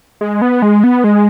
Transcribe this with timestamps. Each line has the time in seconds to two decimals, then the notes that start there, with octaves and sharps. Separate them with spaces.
0.21 G#3
0.42 B3
0.62 G#3
0.84 B3
1.04 G#3